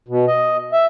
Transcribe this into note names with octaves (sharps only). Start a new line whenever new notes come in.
B2
D#5
E5